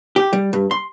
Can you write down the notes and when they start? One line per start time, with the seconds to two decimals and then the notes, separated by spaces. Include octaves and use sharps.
0.16 G4
0.33 G3
0.53 G2
0.71 C6